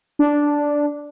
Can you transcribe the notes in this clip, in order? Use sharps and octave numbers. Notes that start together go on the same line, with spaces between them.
D4